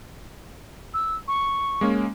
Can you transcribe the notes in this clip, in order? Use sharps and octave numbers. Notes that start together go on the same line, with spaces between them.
E6
C#6
G#3 A#3 C#4